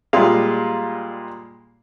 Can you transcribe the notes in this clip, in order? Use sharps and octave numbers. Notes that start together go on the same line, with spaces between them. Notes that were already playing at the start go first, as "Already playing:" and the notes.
A#2 G3 G#3 F5